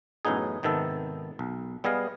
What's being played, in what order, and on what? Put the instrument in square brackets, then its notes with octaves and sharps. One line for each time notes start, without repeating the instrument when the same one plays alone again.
[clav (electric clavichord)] A1 F#2 A2 B3 D#4 G#4
G#1 C3 D#3 B3 A4
B1
G3 B3 G#4 D#5 F5